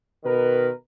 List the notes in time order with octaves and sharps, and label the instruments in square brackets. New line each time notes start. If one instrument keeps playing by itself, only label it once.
[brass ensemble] B2 D#3 A#4 B4